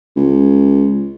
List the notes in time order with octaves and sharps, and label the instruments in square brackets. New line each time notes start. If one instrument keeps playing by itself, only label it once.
[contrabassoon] C#2